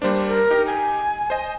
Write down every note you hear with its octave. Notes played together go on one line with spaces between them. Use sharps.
G3 A#3 D4 C5
A#4
D#4 G4
G#5
C5 D#5